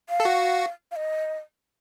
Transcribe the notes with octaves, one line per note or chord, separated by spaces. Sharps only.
F5
A4
F#4
F5
D#5